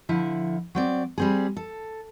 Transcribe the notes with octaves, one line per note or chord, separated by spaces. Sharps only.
D3 F3 E4 E5
F#3 C4 D5
G3 C4 G#4
A4